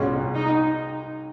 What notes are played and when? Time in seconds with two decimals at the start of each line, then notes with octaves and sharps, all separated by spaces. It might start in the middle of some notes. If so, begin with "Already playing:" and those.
Already playing: C2 B2 G#3 C#4 F4
0.34 D#4